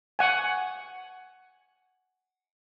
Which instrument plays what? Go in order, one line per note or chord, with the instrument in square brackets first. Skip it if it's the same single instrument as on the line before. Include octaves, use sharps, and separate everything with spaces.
[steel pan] F#5 G#5